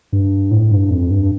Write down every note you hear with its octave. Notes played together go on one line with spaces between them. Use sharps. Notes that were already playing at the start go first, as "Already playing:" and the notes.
G2
A2
G2
F2
G2